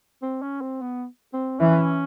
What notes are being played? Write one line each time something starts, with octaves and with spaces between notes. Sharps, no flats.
C4
C#4
C4
B3
C4
E3 C#4